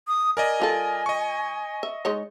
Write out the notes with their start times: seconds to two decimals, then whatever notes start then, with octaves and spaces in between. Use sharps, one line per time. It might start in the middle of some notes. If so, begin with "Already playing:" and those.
0.08 D#6
0.37 A#4 D5 D#5 G#5
0.60 G3 F4 A4
1.06 D#5 C#6
1.83 E5
2.05 G#3 D#4 C#5